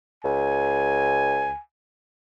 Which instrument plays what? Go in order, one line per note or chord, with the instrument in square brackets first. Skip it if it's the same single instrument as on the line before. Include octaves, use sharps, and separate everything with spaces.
[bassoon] C#2 [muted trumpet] G#5